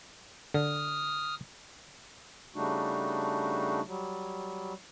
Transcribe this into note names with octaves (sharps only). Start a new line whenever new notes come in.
D3 D#6 F6
C#3 G3 A3 D4 D#4 F#4
F#3 G3